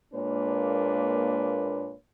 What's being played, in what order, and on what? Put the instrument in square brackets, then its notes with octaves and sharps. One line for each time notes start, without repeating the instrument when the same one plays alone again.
[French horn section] A#2 G#3 A#3 D4 B4 C#5